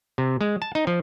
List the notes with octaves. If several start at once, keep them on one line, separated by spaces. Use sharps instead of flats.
C3
G#3
A5
D#4
F3